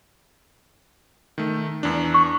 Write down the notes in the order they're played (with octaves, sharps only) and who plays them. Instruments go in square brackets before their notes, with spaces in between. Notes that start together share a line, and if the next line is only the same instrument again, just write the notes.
[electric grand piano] D#3 A3
E2 D4
[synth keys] C#6